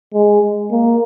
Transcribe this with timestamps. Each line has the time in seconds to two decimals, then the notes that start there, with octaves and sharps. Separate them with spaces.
0.14 G#3
0.71 A#3